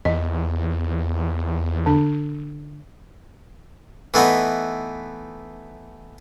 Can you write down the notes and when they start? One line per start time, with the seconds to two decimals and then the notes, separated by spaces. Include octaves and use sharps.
0.05 E2 D#5
1.86 D3 D4
4.14 E3 A3 B3 D#4